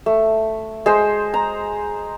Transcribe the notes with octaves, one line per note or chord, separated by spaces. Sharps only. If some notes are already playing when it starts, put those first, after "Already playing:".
A3
G#3 C5
A#5